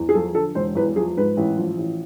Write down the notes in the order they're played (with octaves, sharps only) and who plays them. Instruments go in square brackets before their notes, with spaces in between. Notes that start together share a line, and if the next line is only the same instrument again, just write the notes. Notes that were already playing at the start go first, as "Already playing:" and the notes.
Already playing: [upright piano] E2
G#4
F3 A4
D3 A4
E1 C5
E2 B4
F3 G#4
G#2 B4
A1
F3
A1